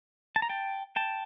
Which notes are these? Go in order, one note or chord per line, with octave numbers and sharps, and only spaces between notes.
A5
A#5
G5 A5
G5 A5